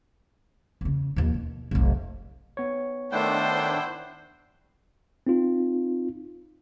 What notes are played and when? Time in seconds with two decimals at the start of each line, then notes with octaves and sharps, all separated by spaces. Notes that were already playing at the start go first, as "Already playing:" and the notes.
0.81 E2 C#3
1.16 D#2 F3
1.34 B2
1.71 F1 B1
2.57 B3 C#5
3.12 D#3 A3 D4 E4 C5 F#5 G5
5.27 C4 D#4 F4